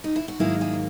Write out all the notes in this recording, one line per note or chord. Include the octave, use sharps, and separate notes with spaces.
D#4
E4
F#4
G#2 D#3 F#3 A#3 E4 G#4
E4 G#4